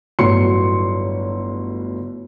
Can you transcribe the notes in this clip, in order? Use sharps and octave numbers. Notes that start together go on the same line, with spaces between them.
G1 A2 F#3 C#5 C6 C#7